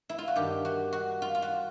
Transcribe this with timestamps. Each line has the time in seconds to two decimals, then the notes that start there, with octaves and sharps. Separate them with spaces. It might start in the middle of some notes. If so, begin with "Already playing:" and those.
0.09 E4
0.18 F4
0.28 F#4
0.36 G2 D#3 G4
0.65 F#4
0.93 F#4
1.22 F4
1.35 F4
1.42 F#4